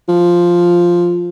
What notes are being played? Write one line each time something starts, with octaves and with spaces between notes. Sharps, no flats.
F3